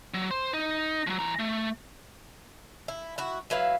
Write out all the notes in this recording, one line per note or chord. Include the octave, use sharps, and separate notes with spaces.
F#3
C5
D#4
F3 F#3
E3 A#5
A3
E4
E4 F#4
F#3 E4 B4 F5